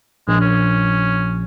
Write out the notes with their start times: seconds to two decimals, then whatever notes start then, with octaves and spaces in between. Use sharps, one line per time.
0.28 A#1 G#3
0.41 C#4